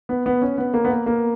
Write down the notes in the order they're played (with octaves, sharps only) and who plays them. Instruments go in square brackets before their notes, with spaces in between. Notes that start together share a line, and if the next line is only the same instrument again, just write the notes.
[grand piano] B3
B3
C#4
B3
A#3
B3
A#3
A#3